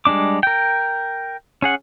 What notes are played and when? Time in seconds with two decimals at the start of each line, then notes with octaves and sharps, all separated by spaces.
0.05 G3 G#3 C#4 D4 D6
0.43 A#4 G5
1.62 C#4 G#4 F#5